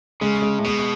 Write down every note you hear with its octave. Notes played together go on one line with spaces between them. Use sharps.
C#3 G#3
G#3
A2
B2 G#3